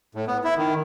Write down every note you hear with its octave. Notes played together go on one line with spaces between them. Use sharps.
A2
B3
E4
D#3